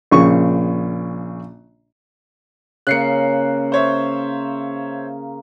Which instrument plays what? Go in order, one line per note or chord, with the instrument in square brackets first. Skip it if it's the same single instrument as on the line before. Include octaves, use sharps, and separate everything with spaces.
[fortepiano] A#1 C#3 C#6
[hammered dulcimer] C#3 A#3 [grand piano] F#6 C7 C#7
[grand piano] C5 C#5 E5